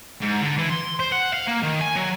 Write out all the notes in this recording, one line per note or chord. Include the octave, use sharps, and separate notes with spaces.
G#2
D3
E3
C6
C5
F#5
F5
A#3
D#3
G#5
F#3